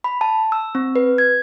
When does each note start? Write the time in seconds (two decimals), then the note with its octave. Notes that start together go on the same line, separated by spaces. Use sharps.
0.04 B5
0.21 A5
0.52 E6
0.75 C4
0.95 B4
1.18 G#6